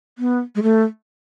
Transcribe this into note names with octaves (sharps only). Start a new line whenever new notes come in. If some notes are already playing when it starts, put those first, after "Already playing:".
B3
G#3
A3